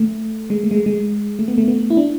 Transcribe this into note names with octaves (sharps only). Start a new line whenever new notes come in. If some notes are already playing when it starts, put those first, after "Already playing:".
Already playing: A3
G#3
A3
G#3
G#3
A3
B3
A3
B3
E4
D4